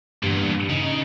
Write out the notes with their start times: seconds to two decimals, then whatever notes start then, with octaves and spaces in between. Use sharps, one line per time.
0.23 E2 G2 A#2
0.69 C#3 D#4